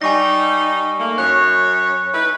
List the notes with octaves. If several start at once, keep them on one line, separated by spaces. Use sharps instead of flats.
G3 D#4 G#5 C#6 A#6
A3 A#3
F#2 C#5 F#6
D#4 E4 B4